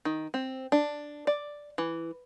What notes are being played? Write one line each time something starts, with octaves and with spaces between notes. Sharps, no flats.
D#3
C4
D4
D5
E3